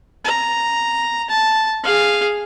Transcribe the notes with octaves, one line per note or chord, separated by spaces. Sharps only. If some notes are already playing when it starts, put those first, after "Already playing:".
A#5
A5
G#4 F5